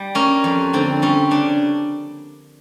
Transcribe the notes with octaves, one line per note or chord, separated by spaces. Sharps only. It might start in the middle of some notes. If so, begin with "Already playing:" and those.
Already playing: G3
A#3 C#4
F2
D3 C4
G3 C#4
C#3 D4